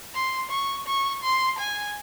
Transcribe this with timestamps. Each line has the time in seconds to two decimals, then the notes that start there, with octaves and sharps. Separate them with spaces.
0.14 C6
0.50 C#6
0.87 C#6
1.23 C6
1.59 G#5